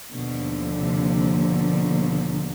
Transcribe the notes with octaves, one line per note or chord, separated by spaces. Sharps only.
D#2 B2 D3 F3
C3
B2